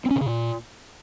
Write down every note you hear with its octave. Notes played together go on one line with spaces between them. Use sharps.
C4
C#4
C3
C#3
A#2